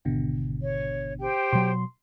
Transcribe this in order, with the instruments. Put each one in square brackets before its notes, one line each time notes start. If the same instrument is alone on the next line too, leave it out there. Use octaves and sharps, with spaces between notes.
[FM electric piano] G#1 B2 D3
[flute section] C#5
G4 C5 G5
[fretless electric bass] B2 F#3 [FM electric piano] C6